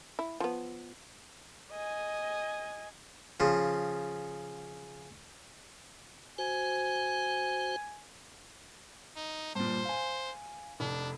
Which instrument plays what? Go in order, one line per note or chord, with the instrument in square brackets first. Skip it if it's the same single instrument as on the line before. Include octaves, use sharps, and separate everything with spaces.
[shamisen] E4
F3 B3
[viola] D#5 G#5
[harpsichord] C#3 F3
[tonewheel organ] F#4 C5 [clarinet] G#5
[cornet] D#4
[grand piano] G2 A#2 [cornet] C5
[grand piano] F5 G#5
[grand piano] F1 [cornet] D4